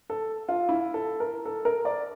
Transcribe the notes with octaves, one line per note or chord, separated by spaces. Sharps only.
A4
F4
E4
A4
A#4
A4
A#4
D5